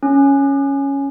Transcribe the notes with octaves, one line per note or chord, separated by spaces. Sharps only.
C#4